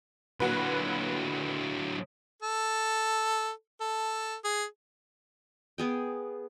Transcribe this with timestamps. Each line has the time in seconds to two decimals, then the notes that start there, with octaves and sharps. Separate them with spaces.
0.40 A#2 D3 F#3 F#4 B4
2.42 A4
3.81 A4
4.44 G#4
5.78 B3 G#4 G5